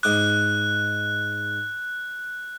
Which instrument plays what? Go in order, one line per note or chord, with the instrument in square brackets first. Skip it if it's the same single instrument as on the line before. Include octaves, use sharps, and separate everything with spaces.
[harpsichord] G#2 D6 D#6 [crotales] F#6